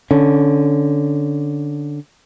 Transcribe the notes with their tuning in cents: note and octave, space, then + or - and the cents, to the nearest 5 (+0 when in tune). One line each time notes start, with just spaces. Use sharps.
D3 +0 C#4 +0